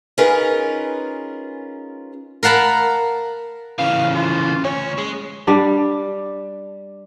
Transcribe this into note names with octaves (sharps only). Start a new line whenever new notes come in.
C#4 D#4 F4 G#4 A#4 B4
A#4 F5 F#5 A5 B5
C#3 E3 F5
F4
D2 C#4 C#5
G#3
G3 D4